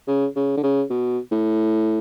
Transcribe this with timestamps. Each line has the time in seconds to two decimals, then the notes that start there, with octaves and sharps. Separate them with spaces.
0.07 C#3
0.36 C#3
0.57 D3
0.63 C#3
0.90 B2
1.31 A2